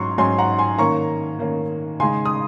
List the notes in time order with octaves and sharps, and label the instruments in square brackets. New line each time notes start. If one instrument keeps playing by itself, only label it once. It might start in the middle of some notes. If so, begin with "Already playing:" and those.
Already playing: [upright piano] G#2 F#3 C#4 A#5 C6 C#6
G#2 F#3 C#4 G#5 C6
F#5 A#5
G#5 C6
D#3 A#3 C#4 A#5 C#6
D#3 A#3 C#4
C#3 G#3 D#4 G#5 C6
D#6